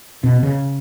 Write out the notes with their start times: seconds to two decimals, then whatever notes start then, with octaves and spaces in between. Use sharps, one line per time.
0.24 B2
0.43 C#3